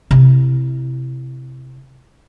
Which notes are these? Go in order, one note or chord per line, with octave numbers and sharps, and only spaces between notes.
C3 E4